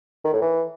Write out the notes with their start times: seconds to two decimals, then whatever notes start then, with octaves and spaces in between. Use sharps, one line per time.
0.24 D#3
0.33 A2
0.41 E3